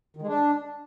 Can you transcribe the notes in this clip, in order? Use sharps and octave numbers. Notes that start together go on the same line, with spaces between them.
D#3
G#3
D4